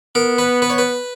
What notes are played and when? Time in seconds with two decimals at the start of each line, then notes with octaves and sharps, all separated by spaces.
0.15 B3 A#4
0.38 B4
0.62 B4
0.70 C#5
0.78 B4